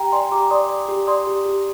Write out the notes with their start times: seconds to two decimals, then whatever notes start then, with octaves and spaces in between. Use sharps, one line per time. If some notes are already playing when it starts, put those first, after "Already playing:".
Already playing: G4 G5 A#5
0.12 D5 G#5 C6
0.32 G4 A#5 D6
0.51 D5 C6 D#6
0.69 D5
0.89 G4
1.07 D5 C6 D#6
1.27 G4
1.45 G4